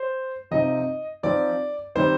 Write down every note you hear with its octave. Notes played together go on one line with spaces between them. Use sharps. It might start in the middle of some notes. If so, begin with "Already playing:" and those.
Already playing: C5
C3 F3 C4 D#4 D#5
F3 C4 D#4 D5
D#3 G3 C4 D#4 C5